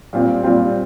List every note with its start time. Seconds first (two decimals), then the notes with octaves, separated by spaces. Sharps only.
0.13 A#2 G3 C4 F4
0.43 A#2 G3 C4 F4